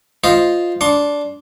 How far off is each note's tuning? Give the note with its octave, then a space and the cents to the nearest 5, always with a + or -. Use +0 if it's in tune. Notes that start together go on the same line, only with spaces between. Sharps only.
F4 +0 C5 +0 D#5 +0
D4 -10 C6 +25